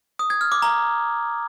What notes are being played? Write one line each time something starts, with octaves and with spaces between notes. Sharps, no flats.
D#6
G#6
F6
D6
A#5